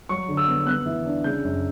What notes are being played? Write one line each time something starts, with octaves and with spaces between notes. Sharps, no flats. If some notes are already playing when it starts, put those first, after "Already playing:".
F#3 C#6
D3
E6
B3
B3 F#6
E3
D4
C#3 G6
F#2